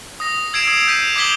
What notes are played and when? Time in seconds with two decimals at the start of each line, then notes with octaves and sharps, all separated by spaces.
0.20 D#6 A#6
0.53 E6 G#6 C7 D7 E7
0.67 D#6 E6
0.88 G6 B6 D#7
1.16 D6 D#6 G#6 B6 F#7 G7